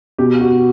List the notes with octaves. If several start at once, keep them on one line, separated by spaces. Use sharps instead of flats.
B2 G4
F#4